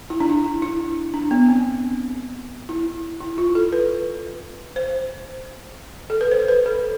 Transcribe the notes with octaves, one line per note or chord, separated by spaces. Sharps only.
E4
D4
E4
E4
D4
B3
C4
E4
E4
F4
A4
B4
C5
A4
B4
C5
B4
A4